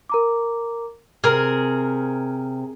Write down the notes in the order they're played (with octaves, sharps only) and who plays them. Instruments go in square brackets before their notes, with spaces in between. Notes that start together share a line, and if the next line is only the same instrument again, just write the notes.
[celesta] A#4 A#5 D6
[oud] C3 [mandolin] G#4 A#4 [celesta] F6